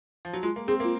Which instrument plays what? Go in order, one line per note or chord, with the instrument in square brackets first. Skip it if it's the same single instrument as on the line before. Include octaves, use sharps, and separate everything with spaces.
[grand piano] F3
F#3
[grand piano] G#3 [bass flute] F4
[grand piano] A#3
[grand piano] C4 [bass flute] G#4
[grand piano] A#3
[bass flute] F4